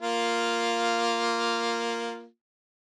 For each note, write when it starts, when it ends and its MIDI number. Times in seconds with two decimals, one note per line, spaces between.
0.01 2.26 58
0.01 2.26 65